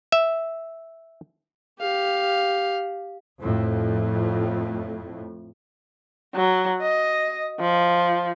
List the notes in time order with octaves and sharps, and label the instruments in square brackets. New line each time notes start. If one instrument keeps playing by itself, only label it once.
[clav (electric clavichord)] E5
[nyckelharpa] G4 F5
[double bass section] F2 A2
[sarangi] F#3
D#5
F3